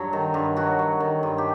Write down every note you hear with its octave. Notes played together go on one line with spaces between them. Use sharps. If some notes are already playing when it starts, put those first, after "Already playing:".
Already playing: G2 F#3
D#3
G2
F#3 F#4
F#3
D#3
G2
G4